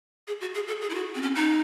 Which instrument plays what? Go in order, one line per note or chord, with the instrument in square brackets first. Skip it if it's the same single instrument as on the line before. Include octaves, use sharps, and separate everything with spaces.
[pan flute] G#4
F#4
G#4
A4
G#4
E4
F#4
C4
C#4
D#4